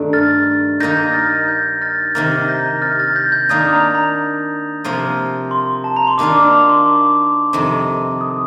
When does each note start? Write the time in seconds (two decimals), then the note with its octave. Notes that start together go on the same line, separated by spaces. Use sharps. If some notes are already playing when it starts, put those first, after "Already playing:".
Already playing: G2 D#3 A3 D4
0.13 F6 A6
0.80 D#3 A#3 D#4 G6 A#6
1.14 F6 A6
1.48 G6
1.82 F6 A6
2.15 C3 D#3 A#3 F6 A6
2.48 G6 A#6
2.82 F6 A6
2.99 F6 A6
3.16 G6 A#6
3.32 G6
3.49 D#3 A#3 D4 F4 D#6
3.73 A#5
3.95 A#5
4.84 C3 F3 A#3 F4
5.51 C6
5.84 A5
5.97 A#5
6.07 C6
6.18 D#3 A#3 D4 F4 D6
6.36 D6
6.52 A#5
6.69 C6
6.86 D6
7.53 F2 C3 D#3
8.21 D#6